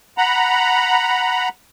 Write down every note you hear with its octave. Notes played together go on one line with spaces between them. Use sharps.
F#5 A#5 B5